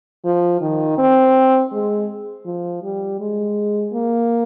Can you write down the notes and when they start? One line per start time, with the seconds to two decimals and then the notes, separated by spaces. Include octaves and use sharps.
0.25 F3
0.61 D#3
0.98 C4
1.72 G#3
2.46 F3
2.83 G3
3.20 G#3
3.93 A#3